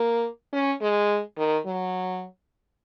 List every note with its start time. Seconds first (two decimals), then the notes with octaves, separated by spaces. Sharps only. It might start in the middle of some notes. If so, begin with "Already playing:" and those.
Already playing: A#3
0.53 C#4
0.81 G#3
1.38 D#3
1.66 F#3